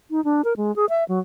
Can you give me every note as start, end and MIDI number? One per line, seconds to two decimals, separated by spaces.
0.11 0.23 63
0.24 0.42 62
0.45 0.56 70
0.57 0.74 56
0.76 0.86 68
0.89 1.04 76
1.09 1.19 54